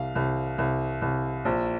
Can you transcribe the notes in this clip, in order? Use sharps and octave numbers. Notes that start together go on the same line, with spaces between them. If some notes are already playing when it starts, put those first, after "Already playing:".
Already playing: C2 F5
C2
C2
C2
A#1